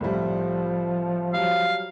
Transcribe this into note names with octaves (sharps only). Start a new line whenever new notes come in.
C2 A2 F3 G3
F#3 G3 F5